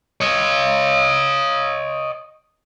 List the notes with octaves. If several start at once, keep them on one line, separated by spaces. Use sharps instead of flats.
C#5 D#5